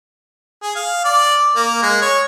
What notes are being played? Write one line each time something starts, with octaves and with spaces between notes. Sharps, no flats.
G#4
F5
D5
A#3
G#3
C#5